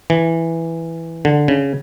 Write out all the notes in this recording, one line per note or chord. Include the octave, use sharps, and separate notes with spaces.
E3
D3
C#3